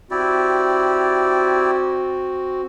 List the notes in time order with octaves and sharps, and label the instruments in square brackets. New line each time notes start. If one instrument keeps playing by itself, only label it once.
[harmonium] C4 F#4 [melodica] E4 G4 D5